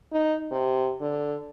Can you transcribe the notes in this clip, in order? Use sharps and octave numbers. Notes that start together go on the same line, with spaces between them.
D#4
C3
D3